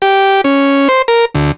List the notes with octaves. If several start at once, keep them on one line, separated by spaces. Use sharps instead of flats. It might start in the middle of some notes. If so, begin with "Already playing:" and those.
G4
C#4
C5
A#4
D2